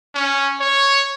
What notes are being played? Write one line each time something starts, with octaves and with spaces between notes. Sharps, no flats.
C#4
C#5